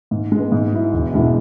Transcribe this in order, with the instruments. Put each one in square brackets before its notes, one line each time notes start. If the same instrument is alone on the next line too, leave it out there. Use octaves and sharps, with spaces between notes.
[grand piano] G#2
G#3 B3
G#2
F#3 E4
E1
E2 B2 G#3 E4